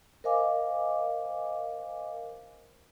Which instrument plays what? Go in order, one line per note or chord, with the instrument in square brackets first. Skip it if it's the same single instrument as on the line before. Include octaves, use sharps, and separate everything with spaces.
[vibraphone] A#4 C5 D#5 F5 G#5 D6